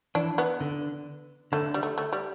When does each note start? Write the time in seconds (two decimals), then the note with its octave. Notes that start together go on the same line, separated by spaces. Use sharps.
0.15 E3 D4
0.38 B3
0.60 D3
1.52 D3 A3
1.74 G3
1.83 A3
1.98 A3
2.13 G3